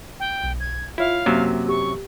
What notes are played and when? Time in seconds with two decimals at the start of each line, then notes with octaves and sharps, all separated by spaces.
0.19 G5
0.43 B1
0.60 G#6
0.98 E4 F4 C#5 E5 F5
1.26 F#2 C3 F#3 A#3
1.68 G4 C#6